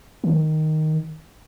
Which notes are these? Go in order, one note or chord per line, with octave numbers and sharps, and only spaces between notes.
D#3